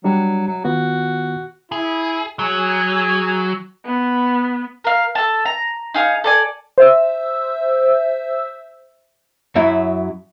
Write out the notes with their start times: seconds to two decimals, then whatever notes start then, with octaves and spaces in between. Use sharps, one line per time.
0.04 F#3 G3 D4
0.47 F#3
0.64 D#3 B3 F4 F#4
1.72 E4 G#4
2.39 F#3 G#4 G#5
3.86 B3
4.84 A#4 F5
5.15 A4 A5
5.45 A#5
5.94 D#4 G#4 F5
6.24 A4 D5 G#5
6.78 C5 E5 E6
9.56 F#2 F#3 E4